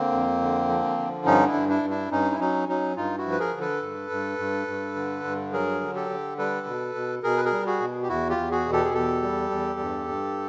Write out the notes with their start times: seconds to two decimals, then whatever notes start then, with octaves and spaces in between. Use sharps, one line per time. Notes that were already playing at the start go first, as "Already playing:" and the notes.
Already playing: D3 A#3 C4
0.12 F2
0.41 D3
0.69 F3
0.97 D3
1.26 G2 C#4 D#4
1.47 D4 E4
1.55 G2
1.68 D4 E4
1.83 G2
1.90 D4 E4
2.11 G2 C#4 D#4
2.31 E4
2.39 F#3 C#4 D#4
2.68 F#3 C#4 D#4
2.96 G2 D#4 F4
3.18 E4 F#4
3.25 F3
3.32 B4
3.39 G#4 A#4
3.53 D3
3.61 A4 B4
3.82 G2
4.10 G2
4.39 G2
4.68 G2
4.96 D3
5.24 G2
5.53 F#3 G#4 A#4
5.81 D3
5.95 G4 A4
6.10 D3
6.38 G3 A4 B4
6.67 B2
6.95 B2
7.23 B2 G#4 A#4
7.37 B4
7.45 G#4 A#4
7.51 G3
7.66 F#4 G#4
7.80 B2
8.03 G4
8.09 E2 E4 F#4
8.29 F4 G4
8.37 E2
8.51 F#4 G#4
8.65 B2
8.72 G4 A4
8.85 G#4
8.94 E2 G4 A4
9.22 G3
9.51 E2
9.79 G2
10.08 G2